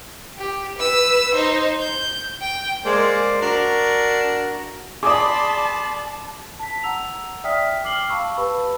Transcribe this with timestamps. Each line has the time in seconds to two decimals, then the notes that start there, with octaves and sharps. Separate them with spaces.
0.38 G4
0.78 B4 E6
1.34 D#4 C5
1.80 G6
2.41 G5
2.85 G#3 A#3 C5 D5
3.42 D4 F#4 A#4
5.03 G#4 D5 A5 B5 C6 D6 D#6
6.59 A5 B6
6.83 F#5 A#5 E6 F7
7.44 D5 E5 G5 D#6 F6 B6
7.84 G5 D6 F6 C7 F#7 G7
8.08 F5 A5 B5 C#6 E6
8.37 G4 B4 A5 B5 E6